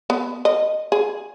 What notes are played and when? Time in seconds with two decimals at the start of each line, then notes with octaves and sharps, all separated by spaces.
0.10 B3
0.45 D#5
0.92 G#4